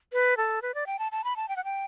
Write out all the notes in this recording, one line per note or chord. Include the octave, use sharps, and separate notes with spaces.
B4
A4
B4
D5
G5
A5
A5
B5
A5
G5
F#5
G5